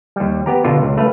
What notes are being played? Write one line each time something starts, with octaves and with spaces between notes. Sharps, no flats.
D#2 G3
B3 G4 A#5
B2 D3 F4
C#2
A3 B4 F5